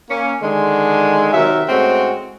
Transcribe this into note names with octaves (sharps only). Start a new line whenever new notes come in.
A#3 C#4
D3 D#3 G#3
C3 D#3 F#3 A#4 E5
A2 G#3 C4 C#4 F#4